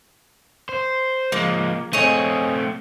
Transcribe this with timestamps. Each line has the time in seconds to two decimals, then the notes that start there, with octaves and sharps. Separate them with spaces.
0.69 C5
1.32 F3 G#3 A#3
1.93 A3 C4 G#4 C#5 D#5